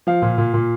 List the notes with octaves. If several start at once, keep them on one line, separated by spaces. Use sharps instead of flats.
F3 F5
A#2
A#2
A#2